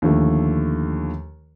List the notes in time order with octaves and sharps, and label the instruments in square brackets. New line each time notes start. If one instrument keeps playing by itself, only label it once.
[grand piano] D#2 D3 F3 A3